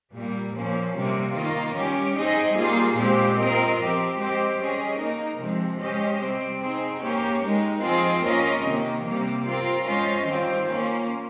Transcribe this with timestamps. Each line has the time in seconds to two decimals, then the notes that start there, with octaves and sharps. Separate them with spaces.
0.13 A#2 G3 A#3
0.53 A#2 F3 A#3 C#4
0.95 C3 G3 A#3
1.34 D#3 A#3 F4 A#4 D#5
1.75 G3 C#4 G4
2.16 C4 D#4 G#4 D#5
2.56 G3 A#3 F4 G#4
2.96 A#2 G#3 C4 G4 C5
3.38 C4 F4 A#4 D#5
3.78 F3 C4 G4
4.18 G#3 C4 G4 C5 D#5
4.58 G3 C#4 G#4 D#5
4.99 A#3 D#4 A#4
5.39 C3 F3 G#3 C4
5.79 G#3 C#4 G4 C5 D#5
6.20 C3 G3 C4
6.60 C4 D#4 G#4
7.01 A#3 C#4 G4 C#5
7.42 G#3 D#4 A#4
7.82 F3 C4 F4 G#4 D#5
8.23 A#3 C#4 F4 A#4 D#5
8.63 C3 D#3 A#3
9.04 C3 G3 A#3
9.45 C4 F4 A#4
9.85 G#3 C#4 F4 C5 D#5
10.25 D#3 G3 C4 F4 C5
10.66 A#3 C#4 F4